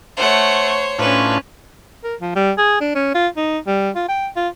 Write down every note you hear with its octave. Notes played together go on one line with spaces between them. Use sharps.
A3 C5 C#5 F#5
C#6
A2 C#4 D4 F4 B4
A#4
F3
G3
G#4
D4
C#4
F4
D#4
G3
F4
G5
F4